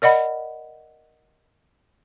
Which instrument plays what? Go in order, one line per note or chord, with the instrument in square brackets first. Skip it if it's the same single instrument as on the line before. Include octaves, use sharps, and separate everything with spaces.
[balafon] A#4 D5 D#5 F#5 B5